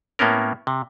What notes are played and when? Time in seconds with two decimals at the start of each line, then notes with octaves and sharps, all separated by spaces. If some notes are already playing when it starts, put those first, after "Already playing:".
0.19 A2 A#3 B3 C#4 A#4
0.67 C3